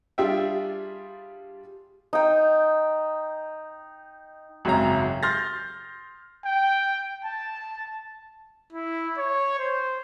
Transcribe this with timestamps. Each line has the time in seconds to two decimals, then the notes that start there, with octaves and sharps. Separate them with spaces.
0.18 G3 D4 F4 G#4 E5 G5
2.13 D#4 G5
4.65 G#1 F#2 C#3 E5 A#5
5.23 C6 F6 G6 A6 A#6
6.45 G5
7.25 A5
8.72 E4
9.18 C#5
9.59 C5